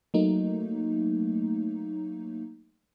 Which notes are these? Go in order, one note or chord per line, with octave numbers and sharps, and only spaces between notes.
F#3 A3 A#3 D#4